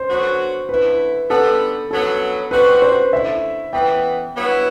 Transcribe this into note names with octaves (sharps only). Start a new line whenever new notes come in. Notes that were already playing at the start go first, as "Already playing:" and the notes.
Already playing: C5
D3 F#3 B3 F#4
D3 A3 E4 B4
D3 G3 B3 A4
G2 F#3 B3 F#4 A4
B2 G3 C4 F#4 B4
C5
D3 A3 E4 E5
A2 E3 B3 G5
G2 F#3 B3 E4